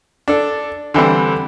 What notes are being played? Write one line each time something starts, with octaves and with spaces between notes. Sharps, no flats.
D4 A4
D3 E3 G3 C4